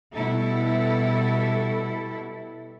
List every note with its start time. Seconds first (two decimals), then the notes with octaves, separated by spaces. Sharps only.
0.14 B2 G3 E4 A4